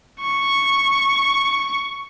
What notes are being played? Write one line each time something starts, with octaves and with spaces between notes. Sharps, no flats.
C#6